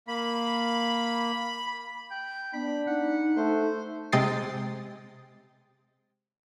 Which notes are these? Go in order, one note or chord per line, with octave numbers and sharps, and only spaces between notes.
A#3 B5
G5
B3 D4 B5
D#4 F#5
A3 C5
C3 G#3 G5 D#6 A6 C7